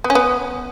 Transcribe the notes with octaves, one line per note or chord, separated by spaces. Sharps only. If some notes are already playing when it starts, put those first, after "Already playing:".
B3
C#4
B3